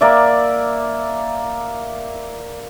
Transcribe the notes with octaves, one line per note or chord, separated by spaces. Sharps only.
A#3 D5 E5